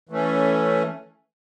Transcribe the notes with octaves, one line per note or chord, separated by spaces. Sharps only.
E3 A3 C#4